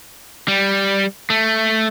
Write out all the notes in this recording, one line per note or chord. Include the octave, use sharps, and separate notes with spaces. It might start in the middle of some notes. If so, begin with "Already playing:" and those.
G3
A3